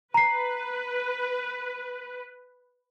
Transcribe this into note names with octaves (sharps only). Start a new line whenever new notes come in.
B4 A#5 C7